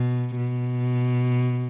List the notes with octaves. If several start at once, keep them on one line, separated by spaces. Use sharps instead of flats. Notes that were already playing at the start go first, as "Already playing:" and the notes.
Already playing: B2
B2